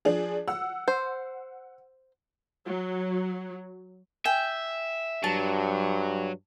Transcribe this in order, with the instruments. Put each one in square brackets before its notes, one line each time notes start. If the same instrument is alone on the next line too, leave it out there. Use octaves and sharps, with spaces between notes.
[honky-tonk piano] F3 D4 G#4
F#5 E6
[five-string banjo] C5
[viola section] F#3
[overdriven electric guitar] E5 [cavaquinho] G5 G#5
[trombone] G2 [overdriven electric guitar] F#3 [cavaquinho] A5